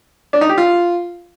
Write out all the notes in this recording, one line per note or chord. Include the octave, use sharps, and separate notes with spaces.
D4
D#4
G4
F4